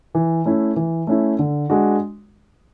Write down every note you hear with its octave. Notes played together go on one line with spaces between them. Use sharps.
E3
A3 C#4 E4
E3
A3 C#4 E4
D3
G#3 D4 F#4